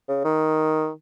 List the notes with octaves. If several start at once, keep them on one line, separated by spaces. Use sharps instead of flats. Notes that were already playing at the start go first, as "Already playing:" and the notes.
C#3
D#3